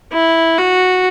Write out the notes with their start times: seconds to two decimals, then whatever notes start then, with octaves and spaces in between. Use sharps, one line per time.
0.13 E4
0.58 F#4